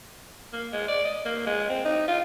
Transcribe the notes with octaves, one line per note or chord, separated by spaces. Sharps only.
A#3
G#3
D5
D#5
A#3
G#3
C4
D#4
F4